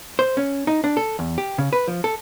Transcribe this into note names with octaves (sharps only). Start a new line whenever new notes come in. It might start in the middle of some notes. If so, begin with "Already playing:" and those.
C5
C#4
D#4
D4
A4
E2
G4
C#3
B4
F3
A4